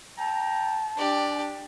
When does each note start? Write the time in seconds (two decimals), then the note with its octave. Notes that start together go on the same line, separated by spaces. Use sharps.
0.18 G5 A5 A#5
0.98 D4 G4 D5